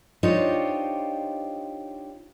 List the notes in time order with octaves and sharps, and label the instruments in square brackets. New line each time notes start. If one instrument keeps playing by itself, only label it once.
[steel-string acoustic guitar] D4 D#4 F4 G4 C5 C#5